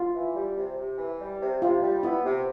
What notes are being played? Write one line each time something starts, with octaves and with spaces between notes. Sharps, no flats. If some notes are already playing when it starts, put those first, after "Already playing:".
Already playing: F4
E3
G3
C3
C3
E3
G3
C3
C3 F4
G3
B3 E4
C3